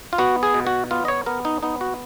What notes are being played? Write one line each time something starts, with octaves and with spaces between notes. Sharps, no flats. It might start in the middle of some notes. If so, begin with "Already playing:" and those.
F4
B3 F#4
G#4
B2
F#4
B3 F4
D#5
C#5
B3 A#4
D#4
B3 D#4
F#4